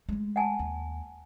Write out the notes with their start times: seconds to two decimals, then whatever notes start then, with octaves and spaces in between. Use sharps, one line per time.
0.09 G#3 A3
0.36 F#5 G#5 A5
0.59 D#2